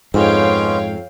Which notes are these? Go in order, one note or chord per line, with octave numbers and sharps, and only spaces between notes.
F2 G#2 G#3 B3 C#4 C#5 F5 G5